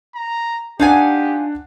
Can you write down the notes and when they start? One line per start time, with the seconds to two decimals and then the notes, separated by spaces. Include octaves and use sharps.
0.15 A#5
0.80 D4 D#4 F4 G4 F#5 G#5